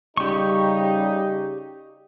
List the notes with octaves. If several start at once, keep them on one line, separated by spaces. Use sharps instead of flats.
C#3 G3 D#4 G4 C#6